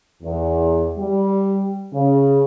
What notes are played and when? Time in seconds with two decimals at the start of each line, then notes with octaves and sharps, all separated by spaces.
0.23 E2
0.97 G3
1.93 C#3